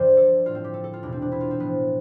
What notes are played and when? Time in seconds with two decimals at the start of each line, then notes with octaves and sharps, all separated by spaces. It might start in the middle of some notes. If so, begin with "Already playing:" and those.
Already playing: G2 D3 F3 C5 D5
0.17 A4
0.45 A2 F3 F4
0.55 C4
0.64 G4
0.74 A4
0.84 A4
0.93 F4
1.03 E2 B2 D4
1.12 C4
1.22 D4
1.32 E4
1.41 F4
1.51 C4
1.60 A2 F3 B3